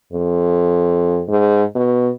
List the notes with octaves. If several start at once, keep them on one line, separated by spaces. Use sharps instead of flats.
F2
G#2
B2